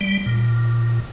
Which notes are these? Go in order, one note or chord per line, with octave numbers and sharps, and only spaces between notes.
G3
A#2